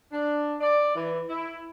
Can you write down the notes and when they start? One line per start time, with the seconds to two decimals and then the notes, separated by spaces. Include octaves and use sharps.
0.12 D4
0.60 D5
0.95 E3
1.29 E4